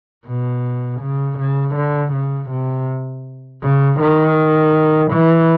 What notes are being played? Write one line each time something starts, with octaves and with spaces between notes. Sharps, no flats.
B2
C#3
C#3
D3
C#3
C3
C#3
D#3
E3